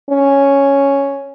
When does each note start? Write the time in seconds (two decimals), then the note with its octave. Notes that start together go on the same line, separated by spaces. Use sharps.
0.10 C#4